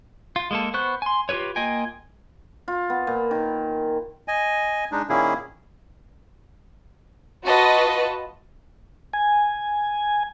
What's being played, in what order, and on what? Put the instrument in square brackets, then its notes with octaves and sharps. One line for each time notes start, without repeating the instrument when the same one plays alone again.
[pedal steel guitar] F4
G#3 A#3 A4
B3 C5 C#6 F#6
G#5 C6
F4 G4 A4 B4 C#5
A#3 F4 D#5 G5 G#5
[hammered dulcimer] F4
B3
A#2
D#3
[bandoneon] D#5 G#5
G#3 D4 D#4
A#2 D#3 A#3 C#4 E4 G#4
[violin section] F4 F#4 B4 D#5 A5
[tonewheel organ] G#5